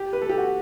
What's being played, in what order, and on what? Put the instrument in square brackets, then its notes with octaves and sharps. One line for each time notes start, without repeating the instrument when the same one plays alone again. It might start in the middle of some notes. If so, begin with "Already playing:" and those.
Already playing: [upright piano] G4
B4
A4
G4
F#4